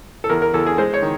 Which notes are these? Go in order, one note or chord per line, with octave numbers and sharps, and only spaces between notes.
A4
E2 A#4
A#4
E2 A4
G#4
G#3 C5
C#5
D#3